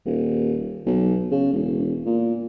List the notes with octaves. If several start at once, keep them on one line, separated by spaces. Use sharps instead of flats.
D#1
B1
C#3
E1
A#2